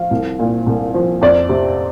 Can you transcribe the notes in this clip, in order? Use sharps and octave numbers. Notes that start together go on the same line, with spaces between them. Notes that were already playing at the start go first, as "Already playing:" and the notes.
Already playing: F3 F5
C2
A#2
C2
F3
F2 D5
C3